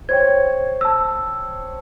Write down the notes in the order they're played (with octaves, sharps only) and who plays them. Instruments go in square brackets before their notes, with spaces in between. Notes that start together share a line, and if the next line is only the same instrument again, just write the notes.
[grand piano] C5 C#5 G5 [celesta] G#6
[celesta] A5 E6